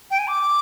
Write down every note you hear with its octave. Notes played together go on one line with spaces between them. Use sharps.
G5
G#5
D6